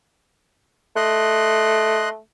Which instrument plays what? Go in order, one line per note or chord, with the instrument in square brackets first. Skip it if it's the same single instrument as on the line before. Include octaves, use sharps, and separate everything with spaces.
[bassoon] A3 [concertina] D#5 C6 F#6